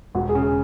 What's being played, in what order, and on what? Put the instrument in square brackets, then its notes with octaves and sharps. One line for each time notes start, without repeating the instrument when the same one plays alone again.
[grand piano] E1 [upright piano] F#4
[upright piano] G#4
[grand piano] C#3
[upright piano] G#4